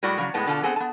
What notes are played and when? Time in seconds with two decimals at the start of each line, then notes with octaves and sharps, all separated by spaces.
0.03 A2 G3 G#3 F#4 D5
0.18 C#3 F#3
0.34 A2 G#3 B3 A5
0.46 B2 D3 F4 A5
0.63 B3 C4 G#4 A4
0.76 B3 A5